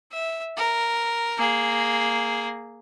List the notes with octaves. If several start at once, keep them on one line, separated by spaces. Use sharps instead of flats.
E5
A#4
A#3 G#4